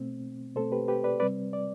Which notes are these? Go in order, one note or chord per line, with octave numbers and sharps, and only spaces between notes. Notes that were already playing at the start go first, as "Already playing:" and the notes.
Already playing: B2 A3 C4
B2 A3 C4 A4 C5
G4 B4
G4 B4
B4 D5
C3 G3 C4 B4 D5
D5